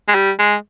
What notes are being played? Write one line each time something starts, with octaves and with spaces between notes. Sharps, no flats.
G#3
G3
G#3